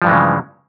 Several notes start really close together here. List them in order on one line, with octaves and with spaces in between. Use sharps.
F3 G2 E3 G#3 C#3